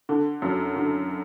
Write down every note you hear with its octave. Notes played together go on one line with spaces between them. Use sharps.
D3
F#2
D3